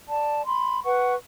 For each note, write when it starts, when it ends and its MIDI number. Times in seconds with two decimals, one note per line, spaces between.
0.09 0.45 74
0.09 0.45 81
0.46 0.81 83
0.46 0.81 84
0.85 1.14 71
0.85 1.14 78
0.85 1.14 85